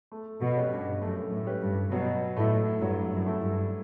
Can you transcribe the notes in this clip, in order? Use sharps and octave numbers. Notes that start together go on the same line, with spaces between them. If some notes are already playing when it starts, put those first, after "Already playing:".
A3
B2
C#4 G4 B4
G2
F#2 A3
A2
C#4 G4 B4
G2
B2 F#3
A2 A3 E4
G2 F#3
F#2
A3 E4
G2